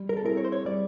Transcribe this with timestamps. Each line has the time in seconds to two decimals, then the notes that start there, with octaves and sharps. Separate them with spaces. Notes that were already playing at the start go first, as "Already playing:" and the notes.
Already playing: G3
0.09 A#4
0.17 A4
0.23 C4 E4 G#4 A#4
0.37 C#5
0.45 C5
0.52 C#5
0.65 G3 D5